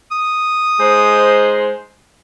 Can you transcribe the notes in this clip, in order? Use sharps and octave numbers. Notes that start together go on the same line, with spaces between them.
D#6
G#3 D#4 C5